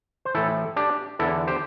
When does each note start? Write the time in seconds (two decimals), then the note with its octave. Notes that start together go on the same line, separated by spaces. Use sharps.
0.25 C5
0.35 A2 E3 E4 A4
0.76 D4 G4
1.19 E2 D3 E4 A4
1.47 G4 C5